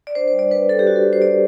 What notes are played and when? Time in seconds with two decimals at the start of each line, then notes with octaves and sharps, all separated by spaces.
0.07 D5
0.15 D4 C5
0.28 C5
0.33 G3
0.39 D5
0.51 D4 B4
0.68 G3 A4
0.79 G4
0.87 D4 F#4
0.96 A4
1.04 G3
1.13 C5
1.22 F#4 D5